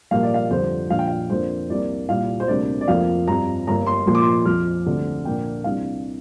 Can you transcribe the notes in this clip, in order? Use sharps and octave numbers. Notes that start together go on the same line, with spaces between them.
A#1 A#2 G3 A#3 F5
D5
F5
F2 D3 G3 C4 C5
A#1 A#2 F3 D4 F5
G5
F5
F2 F3 A#3 D4 C5
C2 C3 A#3 D5
C2 A#2 G3 F5
C5
D2 C3 G3 A#3 D4 D5
D5
F1 F2 F3 A#3 F5
G2 F3 C4 A#5
G1 G2 G3 A#3 A#5
C6
A#1 A#2 F3 A#3 C6
D6
C6
F2 F3 C4 F6
D2 D3 G3 C4
A#1 A#2 A#3 D4 G5
C2 C3 A#3 D4 F5